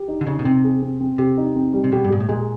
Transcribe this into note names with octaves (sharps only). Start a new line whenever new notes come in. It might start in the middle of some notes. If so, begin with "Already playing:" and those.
Already playing: G4
D#4
D3
C#3 D#4
B2
C3 C4
G#4
C4
C4
C3 G4
D#4
C4
G3
C3
B2 G4
G2
G#2 G4
A2
A#2 G#3